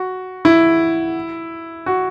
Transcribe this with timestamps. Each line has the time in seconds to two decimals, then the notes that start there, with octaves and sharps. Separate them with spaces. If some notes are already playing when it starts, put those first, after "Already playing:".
Already playing: F#4
0.45 E4
1.86 F#4